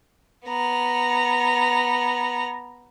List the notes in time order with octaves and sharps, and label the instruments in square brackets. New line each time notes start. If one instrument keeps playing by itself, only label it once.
[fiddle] B3 A#5